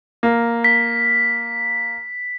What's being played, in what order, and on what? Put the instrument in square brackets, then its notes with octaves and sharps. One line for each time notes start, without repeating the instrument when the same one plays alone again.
[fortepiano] A#3
[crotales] B6